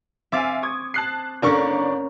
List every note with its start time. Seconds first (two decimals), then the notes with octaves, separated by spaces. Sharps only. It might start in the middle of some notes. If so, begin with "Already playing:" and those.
0.32 C4 E5 F5 G#5 D6 A6
0.62 C#6 D#6 G#6
0.94 A5 F#6 C7
1.42 F#1 C#4 D4 A#4 C#6